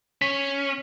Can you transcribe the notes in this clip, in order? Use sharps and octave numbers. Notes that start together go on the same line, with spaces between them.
C#4 B6